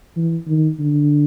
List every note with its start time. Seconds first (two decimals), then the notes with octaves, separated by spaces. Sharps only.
0.17 E3
0.47 D#3
0.79 D3